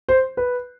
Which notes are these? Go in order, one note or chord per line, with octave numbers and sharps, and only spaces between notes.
C5
B4